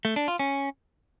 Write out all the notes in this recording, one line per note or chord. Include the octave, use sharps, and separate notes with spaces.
A3
D4
F4
C#4